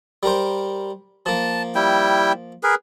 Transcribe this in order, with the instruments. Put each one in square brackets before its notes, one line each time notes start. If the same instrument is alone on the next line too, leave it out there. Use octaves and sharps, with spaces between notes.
[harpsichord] G3 A#4 C5
[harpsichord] F3 A#3 [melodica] A5
[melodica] G3 E4 G5
G#4 A#4 B4